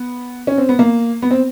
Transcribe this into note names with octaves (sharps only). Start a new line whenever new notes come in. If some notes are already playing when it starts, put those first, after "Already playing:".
Already playing: B3
C#4
C4
B3
A#3
B3
C4